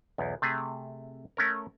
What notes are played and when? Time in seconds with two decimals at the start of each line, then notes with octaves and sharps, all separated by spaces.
0.18 B1 E2
0.42 C3 A3 G#4
1.37 A3 C#4 A#4